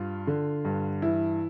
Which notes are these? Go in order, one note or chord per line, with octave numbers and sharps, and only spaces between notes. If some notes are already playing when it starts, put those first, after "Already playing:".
Already playing: G2 F4
D3
G2
E3 E4